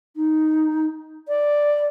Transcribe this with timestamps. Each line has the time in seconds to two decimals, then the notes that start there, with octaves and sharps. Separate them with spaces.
0.16 D#4
1.28 D5